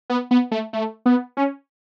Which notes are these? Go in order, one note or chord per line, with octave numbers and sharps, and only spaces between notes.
B3
B3
A3
A3
B3
C#4